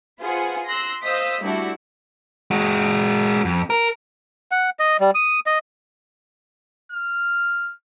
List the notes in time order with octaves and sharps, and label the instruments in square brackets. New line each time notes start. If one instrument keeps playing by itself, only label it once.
[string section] F4 G#4 B4 C5 F#5 G#5
C6 E6 F#6 A#6
C5 D#5 F5 D#6 E6 B6
G3 A3 D4 E4 F#4
[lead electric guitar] G#3 F#4
F2
A#4
[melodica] F#5
D#5
G3
D#6
D#5
[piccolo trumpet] F6